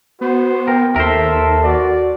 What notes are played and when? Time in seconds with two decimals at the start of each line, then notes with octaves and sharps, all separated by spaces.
0.21 B3 F#4 C5
0.68 A#4 G5
0.96 D#2 A4 A#4 C5 E5
1.63 F#4 D5